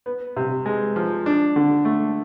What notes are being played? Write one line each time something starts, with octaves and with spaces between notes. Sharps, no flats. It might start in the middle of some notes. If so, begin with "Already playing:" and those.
B3
C3
G#3
F3
D4
D3
A3